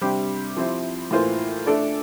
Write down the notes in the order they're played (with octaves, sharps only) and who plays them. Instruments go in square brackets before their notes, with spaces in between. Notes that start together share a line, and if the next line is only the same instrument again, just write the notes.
[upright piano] C3 G3 D4 G4 C5
F3 C4 E4 G4 C5
A2 E3 A#3 F4 C5
A3 D4 A4 D5